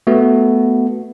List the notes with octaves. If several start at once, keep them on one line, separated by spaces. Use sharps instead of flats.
A3 B3 F#4